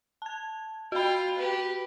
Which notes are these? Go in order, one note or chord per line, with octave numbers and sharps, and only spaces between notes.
A5 G#6
F4 F#4 G5 B5
G4 B4